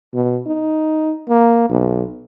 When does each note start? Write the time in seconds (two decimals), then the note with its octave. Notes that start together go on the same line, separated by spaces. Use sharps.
0.14 B2
0.46 D#4
1.29 A#3
1.69 B1